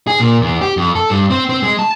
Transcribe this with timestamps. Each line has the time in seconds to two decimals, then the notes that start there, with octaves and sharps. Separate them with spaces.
0.07 G#4
0.20 A#2
0.41 E2
0.61 G4
0.77 F2
0.95 A4
1.10 G2
1.30 C4
1.49 C4
1.63 G#3
1.79 A5